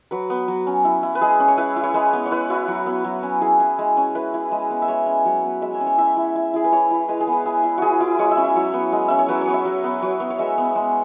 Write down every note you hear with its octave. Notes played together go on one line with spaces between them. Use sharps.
F#3 B4
B3
F#3
C#4
E4
E4
B4
G#3 G#4
C#4
C#5
E4 B4
E4
C#5
G#3 B4
B3
C#5
E4 B4
E4 F#4
F#3
B3
F#3
C#4
E4 G#4
E4
G#3
C#4
E4 B4
E4
G#3
B3
E5
G#3 C#5
C#4
F#3
B3
G#3 E5
C#5
C#4
C#5
E4 E5
E4
E4
E4 G#4
B4
E4 C#5
E4
G#3 B4
G#4
B3
B4
E4 G#4
E4
E4 F#4 G#4
E4
G#3 C#5
E5
C#4
E5
F#3 C#5
B3
G#3
C#4 E5
C#5
F#3 B4
C#5
B3
E5
F#3
B3
F#3
B3
C#5
G#3 E5
B3
G#3